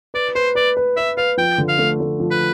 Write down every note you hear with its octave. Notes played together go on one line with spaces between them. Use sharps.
B4 D5
B4 C5
B4 D5
B4
B4 E5
B4 F5
F3 G5
D3
F5
A3
A3
F3
B4